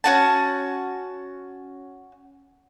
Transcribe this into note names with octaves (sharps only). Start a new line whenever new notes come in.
C#4 F#4 A5